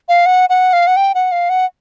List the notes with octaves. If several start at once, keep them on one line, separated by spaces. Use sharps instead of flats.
F5
F#5
F#5
F5
F#5
G5
F#5
F5
F#5